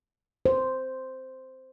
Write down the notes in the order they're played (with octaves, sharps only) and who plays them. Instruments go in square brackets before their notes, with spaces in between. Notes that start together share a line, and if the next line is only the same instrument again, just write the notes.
[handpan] C5